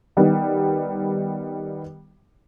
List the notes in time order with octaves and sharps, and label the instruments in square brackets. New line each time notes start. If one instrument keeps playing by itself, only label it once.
[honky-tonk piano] D#3 G3 B3 D#4